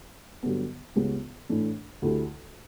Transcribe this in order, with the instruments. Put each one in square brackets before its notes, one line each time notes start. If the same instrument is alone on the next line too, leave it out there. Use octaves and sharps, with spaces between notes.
[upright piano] G2 D3 F#3 B3
C#2 C#3 G3 B3
A2 E3 A3 D4
D2 D3 A3 E4 G4